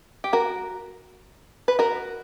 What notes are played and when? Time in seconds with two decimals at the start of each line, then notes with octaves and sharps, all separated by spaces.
0.24 G4
0.33 F#4 A#4
1.68 B4
1.79 F#4 A#4